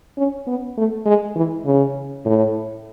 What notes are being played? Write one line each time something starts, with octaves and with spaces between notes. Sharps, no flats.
C#4
B3
A3
G#3
E3
C#3
A2